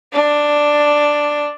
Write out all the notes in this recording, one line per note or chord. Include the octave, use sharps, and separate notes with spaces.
D4